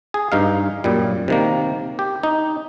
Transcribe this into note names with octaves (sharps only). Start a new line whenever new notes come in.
G#4
G2 D#4 F5
F#2 A#2 G3
C3 D#3 A#3
G4
D#4